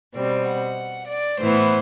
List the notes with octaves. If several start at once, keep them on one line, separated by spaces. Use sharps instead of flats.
B2 G3 C4 D5
F#5
D5
A2 E3 B3 C5